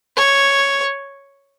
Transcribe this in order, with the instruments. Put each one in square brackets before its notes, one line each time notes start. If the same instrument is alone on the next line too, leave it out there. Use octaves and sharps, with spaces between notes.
[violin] C#5